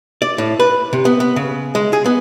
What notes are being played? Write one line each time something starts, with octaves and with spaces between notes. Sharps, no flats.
D5
A2
B4
C3
B3
B3
C#3
G#3
G#4
B3